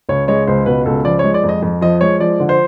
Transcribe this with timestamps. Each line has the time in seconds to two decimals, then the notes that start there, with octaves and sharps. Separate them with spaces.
0.08 C#2 C#5
0.28 G#3 C#5
0.47 C#2 C5
0.66 B2 B4
0.86 C#2 A4
1.05 F3 D5
1.19 C#5
1.24 G#3
1.34 D5
1.43 F2
1.49 D#5
1.62 F2
1.81 F3 D#5
2.01 G#3 C#5
2.20 F3 D5
2.40 D3
2.49 C5